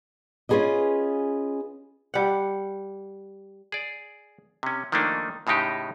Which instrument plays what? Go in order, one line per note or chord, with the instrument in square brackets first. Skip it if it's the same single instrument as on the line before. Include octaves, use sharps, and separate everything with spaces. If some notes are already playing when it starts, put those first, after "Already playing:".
[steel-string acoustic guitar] C#4 F4 F#4 G#4 B4 D#5
[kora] G3 F#5
[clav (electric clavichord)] G#4 D5
C3 C#4
D#3 F3 A3 A#3 D4 D#4
A2 C#3 G#3 D#4 G4